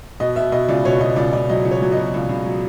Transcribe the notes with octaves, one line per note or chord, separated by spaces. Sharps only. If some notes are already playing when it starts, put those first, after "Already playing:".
B2 D#5
B2 E5
B2 D#5
C#2 D5
B2 C#5
B2 D#5
C#2 D5
C#2 D5
F#3 D#5
C#2
C#5
F#3
B2 D#5
C#2
C#2
F#3